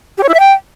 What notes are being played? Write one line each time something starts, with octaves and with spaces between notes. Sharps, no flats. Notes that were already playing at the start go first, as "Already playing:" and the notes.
G4
C#5
E4
E5
G5